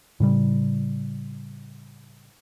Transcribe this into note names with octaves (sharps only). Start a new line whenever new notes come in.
A2 C#3 G3